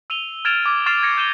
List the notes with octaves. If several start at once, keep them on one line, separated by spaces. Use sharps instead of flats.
E6 D#7 F7 G7
F6 G#6 A6 D7 E7 F7
D6
C#6 F6 A6 C7 E7 F7
G#6 A#6 C#7
G6 D#7 E7 G7